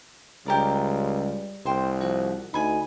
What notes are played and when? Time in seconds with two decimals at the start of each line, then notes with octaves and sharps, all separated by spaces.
0.46 C#2 G3 G4 A#4 D5
1.66 C2 C5 G5
2.01 F3 F#4
2.54 D2 D#4 G#5 B5